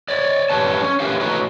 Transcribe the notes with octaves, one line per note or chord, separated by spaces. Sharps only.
C#5 D5
F#2 G3 B4 C#5 A5
C#4
G4 A#4 B4 C#5 E5 F5
A2 D#4 F#4 B4 C#5 A#5